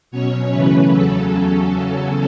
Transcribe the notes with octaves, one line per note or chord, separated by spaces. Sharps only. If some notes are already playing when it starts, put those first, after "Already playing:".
B2 F#3 C#4 C#5
F#2 C#3 E3 A3 C#4 B4
E2 C#3 F#3 C#4 A4